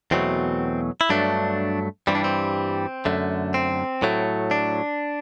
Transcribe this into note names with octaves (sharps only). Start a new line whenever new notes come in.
E2 B2 F#3 A3 C4
E4
G2 F#3 A3 D4
G2 E3 G3 C4
D4
C4
F#2 D3 A3
C4
A2 F#3 A3
D4